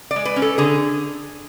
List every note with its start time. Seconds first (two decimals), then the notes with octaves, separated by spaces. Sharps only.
0.11 D5
0.16 G#3
0.25 B4
0.36 C#4
0.42 A4
0.58 D3 G#4